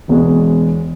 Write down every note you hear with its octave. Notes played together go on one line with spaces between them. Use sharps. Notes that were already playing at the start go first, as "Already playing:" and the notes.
E1 E2 B2 G#3